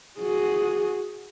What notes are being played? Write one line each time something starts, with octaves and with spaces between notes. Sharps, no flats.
F#4 G#4